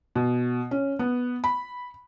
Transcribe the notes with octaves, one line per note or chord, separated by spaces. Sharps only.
B2
C#4
B3
B5